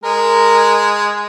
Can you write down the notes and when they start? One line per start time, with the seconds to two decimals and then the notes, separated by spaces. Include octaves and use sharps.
0.03 G#3 A#4